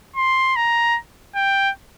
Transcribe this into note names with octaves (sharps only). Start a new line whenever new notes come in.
C6
A#5
G5